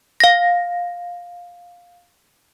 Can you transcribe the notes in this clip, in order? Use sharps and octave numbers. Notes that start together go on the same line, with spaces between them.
F5 A#6